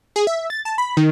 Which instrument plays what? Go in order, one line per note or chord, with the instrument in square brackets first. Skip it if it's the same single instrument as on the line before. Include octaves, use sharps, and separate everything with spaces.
[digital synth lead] G#4
E5
A6
A5
B5
D#3